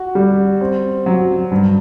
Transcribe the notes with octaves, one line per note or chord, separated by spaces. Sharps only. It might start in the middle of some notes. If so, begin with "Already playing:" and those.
Already playing: F#4
G3
C4
F#3
G2